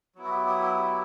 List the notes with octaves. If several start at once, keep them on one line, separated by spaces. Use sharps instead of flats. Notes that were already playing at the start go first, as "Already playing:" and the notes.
F#3 B3 E4
F#4
G4
G4
G4
G4